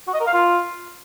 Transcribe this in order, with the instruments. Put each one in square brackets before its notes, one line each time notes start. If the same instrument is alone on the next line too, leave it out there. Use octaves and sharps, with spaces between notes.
[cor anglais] F#4
D#5
A#4
F5
F4